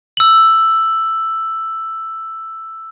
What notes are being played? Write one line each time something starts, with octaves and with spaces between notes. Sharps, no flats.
E6 F#7